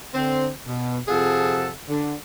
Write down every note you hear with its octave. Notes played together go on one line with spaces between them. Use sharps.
D3 C4
B2
F2 C3 F3 G#4 A4 F#5
D3